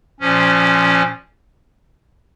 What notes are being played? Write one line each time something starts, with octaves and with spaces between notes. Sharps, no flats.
A#2 F3 C#4